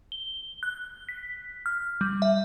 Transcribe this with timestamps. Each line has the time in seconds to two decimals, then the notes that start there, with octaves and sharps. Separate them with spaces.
0.12 G7
0.63 F#6
1.09 B6
1.66 F6
2.01 G3
2.22 E5